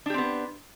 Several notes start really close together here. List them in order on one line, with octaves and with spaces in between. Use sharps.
D4 G4 C4 B3